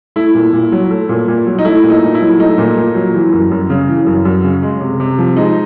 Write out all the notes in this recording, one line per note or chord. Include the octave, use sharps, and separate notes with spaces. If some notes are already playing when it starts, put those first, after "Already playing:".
A3 E4
A#2
A#2
F#3
A3
A#2
A#2
F#3
D#4
A3 E4
A#2
D#4
A#2
E4
F#3
A3 D#4
A#2
A#2
F#3
E3
F#2
F#2
C#3
E3
F#2
F#2
C#3
G#3
C3
C3
F3
G#3 D#4